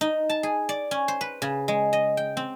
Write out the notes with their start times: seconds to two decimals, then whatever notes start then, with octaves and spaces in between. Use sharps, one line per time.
0.01 D#4
0.29 A5
0.43 G#4
0.69 D5
0.91 C#4
1.08 C5
1.21 B4
1.42 C#3
1.68 G#3
1.93 D#5
2.17 G5
2.37 C4